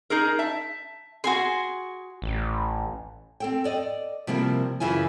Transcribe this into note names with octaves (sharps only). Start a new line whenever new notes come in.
D#4 G#4 A#4
E5 A5
F#4 G#4 G#5 C6
A1
C4 A4 G5
A4 D5 D#5
C3 F3 G3 A#3 E4 A#4
F#2 C#3 E3 E4 F4 G#5